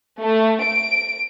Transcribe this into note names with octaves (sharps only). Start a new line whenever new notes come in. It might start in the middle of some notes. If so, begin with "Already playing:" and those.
A3
D7